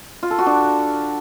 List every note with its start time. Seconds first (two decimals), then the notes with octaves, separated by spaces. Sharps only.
0.23 F4
0.31 A4
0.39 F#4
0.46 D4